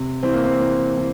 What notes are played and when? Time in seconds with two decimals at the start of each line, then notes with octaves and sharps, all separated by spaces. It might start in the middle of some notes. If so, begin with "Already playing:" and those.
Already playing: C3
0.23 E3 C4
0.33 A#3
0.44 C4
0.60 E3
0.97 E3